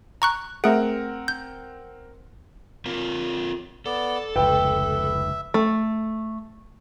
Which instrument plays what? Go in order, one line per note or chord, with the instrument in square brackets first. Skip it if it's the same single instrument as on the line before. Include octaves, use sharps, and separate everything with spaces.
[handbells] A#5 C#6 F#6
[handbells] A3 G#4 [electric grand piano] C4 A#4 F#5
[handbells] G6
[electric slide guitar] C4 F4 A#4
[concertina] B3 D5 [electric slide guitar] A4
[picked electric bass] F1 C#2 [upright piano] B4 G5 [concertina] E5
[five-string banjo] A3